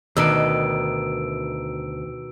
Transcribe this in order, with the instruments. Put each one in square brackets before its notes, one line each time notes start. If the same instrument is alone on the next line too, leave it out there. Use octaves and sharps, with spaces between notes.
[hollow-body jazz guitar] D2 [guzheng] B2 D#3 [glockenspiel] E6 D7